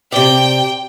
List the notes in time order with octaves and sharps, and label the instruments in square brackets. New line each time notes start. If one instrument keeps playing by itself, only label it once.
[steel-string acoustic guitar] C3 D5 [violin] G5